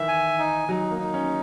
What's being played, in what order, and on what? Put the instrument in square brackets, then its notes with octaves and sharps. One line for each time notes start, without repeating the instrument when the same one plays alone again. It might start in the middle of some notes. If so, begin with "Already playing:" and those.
Already playing: [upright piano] D#3 E3 [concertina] E5
[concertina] G#5
D#4
[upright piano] F#3 [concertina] D#4
[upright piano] A#3
[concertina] D#4
[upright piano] C#4